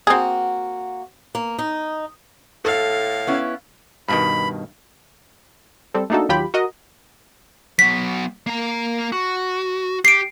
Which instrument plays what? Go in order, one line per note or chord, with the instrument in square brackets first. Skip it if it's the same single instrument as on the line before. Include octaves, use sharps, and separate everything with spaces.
[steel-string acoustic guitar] A#3 F#4 [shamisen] C4 G#4
[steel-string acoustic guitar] A#3
D#4
[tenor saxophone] A2 [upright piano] A4 [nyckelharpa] F5
[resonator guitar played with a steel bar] B3 C#4 E4
[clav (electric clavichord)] G2 B2 D#3 [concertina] B5
[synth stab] G3 C4 A4
A3 A#3 D4 D#4 F#4 A4
D#2 F#3 F4 G4 G5 B5
F#4 A#4 D#5
[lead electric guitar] F#3 B3 [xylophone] B6
[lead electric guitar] A#3 A#5
F#4
[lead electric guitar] G4 [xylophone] C7 D7